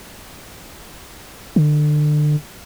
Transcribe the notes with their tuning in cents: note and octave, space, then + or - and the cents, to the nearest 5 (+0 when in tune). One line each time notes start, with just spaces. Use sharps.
D3 +30